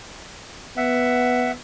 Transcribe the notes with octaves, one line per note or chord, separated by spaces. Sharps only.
B3 E5 F#5